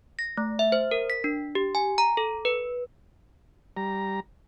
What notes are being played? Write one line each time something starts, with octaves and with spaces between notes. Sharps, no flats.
A#6
A3
E5
C5
A#4
B6
D4
G4
G#5
A#5
A4
B4
G3 A#5